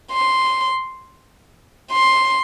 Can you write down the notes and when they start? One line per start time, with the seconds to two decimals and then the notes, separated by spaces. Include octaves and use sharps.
0.12 C6
1.91 C6